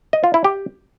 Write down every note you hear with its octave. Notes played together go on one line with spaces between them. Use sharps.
D#5
F4
E4
G4